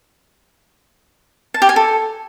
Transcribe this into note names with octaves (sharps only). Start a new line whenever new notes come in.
A5
G4
G#5
A4